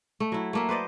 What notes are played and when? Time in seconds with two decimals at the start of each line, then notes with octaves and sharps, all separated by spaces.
0.20 A3
0.32 F#3 E4
0.53 A3 A#3 E5
0.69 B4 C5 D5 D#5